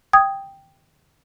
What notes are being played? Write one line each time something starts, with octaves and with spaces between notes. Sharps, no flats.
G5 D#6 G#6